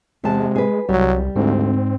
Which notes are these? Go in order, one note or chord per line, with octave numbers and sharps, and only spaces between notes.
E2 C3 G#3 A5
G#4 B4
C2 F#3 G3
D2 G#2 C4